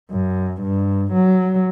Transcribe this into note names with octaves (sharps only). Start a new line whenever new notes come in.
F#2
G2
F#3